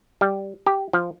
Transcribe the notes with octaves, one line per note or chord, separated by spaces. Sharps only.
G3
G4
F3